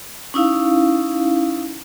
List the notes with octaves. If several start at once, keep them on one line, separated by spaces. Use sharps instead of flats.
C#4 D#4 E4 F5